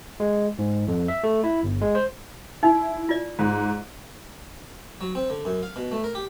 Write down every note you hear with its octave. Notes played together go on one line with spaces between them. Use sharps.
G#3
G#2
F2
E5
A3
E4
G1
G#3
C5
D#4 E4
F4 D5
G#2
F#3
C4
D3
F#2
F5
B2
A3
A#4
G4